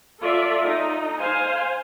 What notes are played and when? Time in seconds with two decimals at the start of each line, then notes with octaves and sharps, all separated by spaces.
0.22 F4 A4 D5 E5
0.64 D#4
1.19 C5 F5 G#5